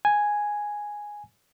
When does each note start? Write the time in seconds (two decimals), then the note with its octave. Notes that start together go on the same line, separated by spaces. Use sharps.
0.05 G#5